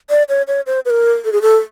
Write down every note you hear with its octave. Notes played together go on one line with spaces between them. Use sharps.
D5
C#5
C#5
C5
B4
A#4
A4
G#4
A4